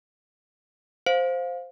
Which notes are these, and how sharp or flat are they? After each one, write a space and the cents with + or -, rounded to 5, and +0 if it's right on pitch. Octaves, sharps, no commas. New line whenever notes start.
C5 +0 F5 +15